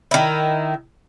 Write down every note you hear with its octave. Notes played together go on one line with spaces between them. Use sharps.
D#3 E4